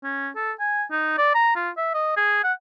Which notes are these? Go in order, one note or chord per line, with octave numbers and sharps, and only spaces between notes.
C#4
A4
G#5
D#4
D5
A#5
F4
E5
D#5
G#4
F#5